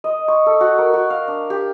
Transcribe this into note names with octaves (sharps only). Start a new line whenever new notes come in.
D#5
C#6
A4
F#4
A#4
F#4
F5
D4
G4